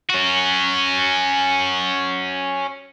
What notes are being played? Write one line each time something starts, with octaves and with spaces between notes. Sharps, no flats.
C#4 F#4